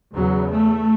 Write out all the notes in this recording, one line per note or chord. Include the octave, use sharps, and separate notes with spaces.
E2 C#3 F#3
A3